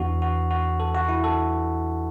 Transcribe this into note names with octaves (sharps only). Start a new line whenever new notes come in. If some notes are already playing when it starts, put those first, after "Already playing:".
Already playing: E2 E3 B3 D4 F#4
F#4
F#4
A4
F#4
E4
A4